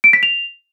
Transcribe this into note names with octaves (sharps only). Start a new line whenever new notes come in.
D7
B6
F7